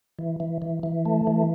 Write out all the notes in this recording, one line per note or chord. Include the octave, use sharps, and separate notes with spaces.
E3
E3
E3
E3
A3
E3